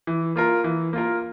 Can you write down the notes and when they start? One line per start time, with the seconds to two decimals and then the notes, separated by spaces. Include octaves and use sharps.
0.07 E3
0.36 A#3 F4 A#4
0.64 E3
0.93 A#3 F4 A#4